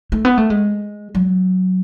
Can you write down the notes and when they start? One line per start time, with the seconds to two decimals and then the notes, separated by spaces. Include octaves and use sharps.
0.12 A3
0.25 B3
0.38 A3
0.50 G#3
1.15 F#3